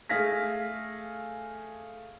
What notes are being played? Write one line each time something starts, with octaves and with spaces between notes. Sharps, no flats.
A3 G#4 F5 A#6 B6